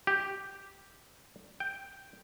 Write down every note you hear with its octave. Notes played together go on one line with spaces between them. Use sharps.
G4
G5